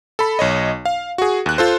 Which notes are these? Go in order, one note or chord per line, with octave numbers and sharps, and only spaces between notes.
A4 B5
B1 C#5 D#5
F5
F#4 G#4
D#2 F#6
F4 A4 C5